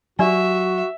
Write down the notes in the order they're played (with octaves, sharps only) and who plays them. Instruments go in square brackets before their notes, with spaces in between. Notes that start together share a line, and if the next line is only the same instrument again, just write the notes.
[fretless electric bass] F#3 [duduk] F#4 [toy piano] G4 D5 G#5 [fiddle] E5